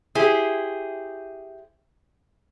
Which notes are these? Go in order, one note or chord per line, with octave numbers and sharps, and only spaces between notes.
E4 G4 G#4 C5